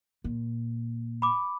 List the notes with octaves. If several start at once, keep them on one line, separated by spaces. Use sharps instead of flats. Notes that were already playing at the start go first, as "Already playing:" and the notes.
A#2
B5 D6